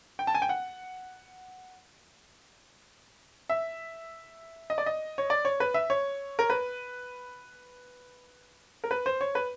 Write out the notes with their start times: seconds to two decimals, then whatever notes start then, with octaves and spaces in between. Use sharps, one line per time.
0.19 G5
0.27 A5
0.35 G#5
0.42 G5
0.49 F#5
3.49 E5
4.70 D#5
4.78 D5
4.86 D#5
5.18 C#5
5.30 D5
5.45 C#5
5.60 B4
5.74 E5
5.90 C#5
6.39 A#4
6.50 B4
8.84 A#4
8.91 B4
9.06 C5
9.21 C#5
9.35 B4